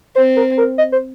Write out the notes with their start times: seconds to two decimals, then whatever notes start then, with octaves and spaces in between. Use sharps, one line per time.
0.15 C4 C5
0.36 A#4
0.57 A#4
0.78 D#5
0.92 C5